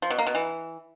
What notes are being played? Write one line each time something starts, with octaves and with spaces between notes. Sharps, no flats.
F3
B2
A#3
B2
E3